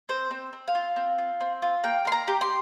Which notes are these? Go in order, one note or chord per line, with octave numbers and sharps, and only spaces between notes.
C4 C5
C4
C4
F5
F4
C4
F4
C4
F4
A#3 G5
A#3 C6
A#5
G4
C6